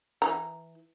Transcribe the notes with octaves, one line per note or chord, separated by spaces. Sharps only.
E3 A#5